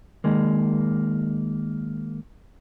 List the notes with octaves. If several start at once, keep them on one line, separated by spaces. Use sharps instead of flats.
D#3 G#3 A#3